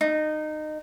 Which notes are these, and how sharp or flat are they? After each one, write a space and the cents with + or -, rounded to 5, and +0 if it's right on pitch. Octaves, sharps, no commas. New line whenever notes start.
D#4 -20